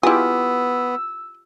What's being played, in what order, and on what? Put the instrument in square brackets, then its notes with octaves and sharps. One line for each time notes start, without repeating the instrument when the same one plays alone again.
[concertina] B3 [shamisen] E4 G#4 [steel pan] F4 G4 [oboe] E6